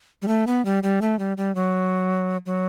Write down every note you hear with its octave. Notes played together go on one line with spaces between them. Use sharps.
G3
A3
B3
G3
G3
A3
G3
G3
F#3
F#3